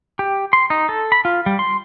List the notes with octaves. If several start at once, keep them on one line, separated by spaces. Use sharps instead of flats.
G4
C6
D#4
A4
B5
F4
G3
C6